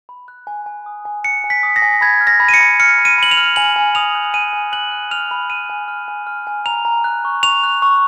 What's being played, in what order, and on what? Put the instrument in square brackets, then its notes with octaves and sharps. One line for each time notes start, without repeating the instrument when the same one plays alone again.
[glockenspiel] B5
F#6
G#5
G#5
D#6
G#5
F#6 C#7
G#5
B6
D#6
A#6
G#5
B5 G#6
F6
A#6
B5
D#7
C#7
B5
F6 C#7
B5
D#7
B5 F#7
F7
F6
G#5 F#7
G#5
D#6 F7
F#6
G#5 D#7
G#5
F#6 F#7
F#6
F6 F7
B5
F6 D#7
G#5
F6
G#5
F6
G#5
A#5 F7
A#5
F#6
C#6
C#6 F7
F#6
C#6